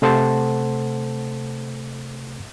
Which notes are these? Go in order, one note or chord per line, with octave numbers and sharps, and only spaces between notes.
C3 A3 A4 C5 F#5 A5